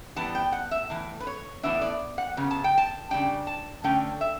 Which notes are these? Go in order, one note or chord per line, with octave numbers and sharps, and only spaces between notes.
E3 G3 B3 A5
G5
F#5
E5
A2 E3
B4
C#5
A2 E3 B3 D4 E5
D5
F#5
C#3 F#3 B3
A5
G5
A5
C#3 G3 D4 G5
A5
D3 A3 C#4 G5
E5